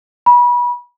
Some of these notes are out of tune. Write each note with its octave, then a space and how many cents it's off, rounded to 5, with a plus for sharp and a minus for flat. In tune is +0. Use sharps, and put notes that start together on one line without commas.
B5 -30